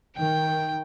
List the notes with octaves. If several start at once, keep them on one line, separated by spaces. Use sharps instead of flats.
D#3 G5